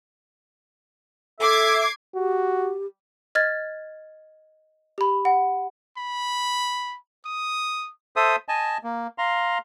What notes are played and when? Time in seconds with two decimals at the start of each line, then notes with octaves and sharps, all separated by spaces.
1.40 A4 E5 D6 G#6 C7
2.15 F#4 G4
3.35 D#5 F6 G#6 A6
4.98 G4 B5
5.25 F#5
5.98 B5
7.25 D#6
8.16 A4 C5 E5 D#6
8.48 D#5 G#5 A5
8.84 A#3
9.18 F5 A#5 C6